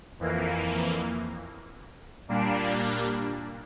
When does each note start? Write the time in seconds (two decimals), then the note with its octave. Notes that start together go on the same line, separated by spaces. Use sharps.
0.20 F2 E3 A#3
2.28 A#2 G3 A#3 D4